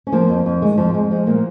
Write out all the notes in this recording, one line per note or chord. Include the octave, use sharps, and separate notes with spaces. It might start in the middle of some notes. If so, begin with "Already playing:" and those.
C#4
F3 A#3
F2
F2
D#3 G#3
F2 F3
F2 G#3
F3 G#3
A#2 A#3